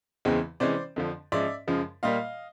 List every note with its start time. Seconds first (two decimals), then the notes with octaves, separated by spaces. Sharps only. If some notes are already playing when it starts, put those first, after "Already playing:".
0.25 E2 C#3 E3 G#3 C4
0.60 C3 E3 G#3 C#4 C5 D5
0.96 F2 D3 F3
1.32 G#2 F3 G#3 C#4 D5 E5
1.67 F#2 C#3 F3 G#3
2.03 A#2 G3 A#3 D#5 F5